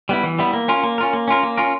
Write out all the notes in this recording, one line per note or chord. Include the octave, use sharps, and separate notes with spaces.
G3 B3 E4
E3
G3 B3 E4
A#3
C#4 F4 A#4
A#3
C#4 F4 A#4
A#3
C#4 F4 A#4
A#3
C#4 F4 A#4